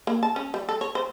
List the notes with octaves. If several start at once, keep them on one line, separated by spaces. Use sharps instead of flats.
A#3
A5
C#4
G3
A4
C#5
C5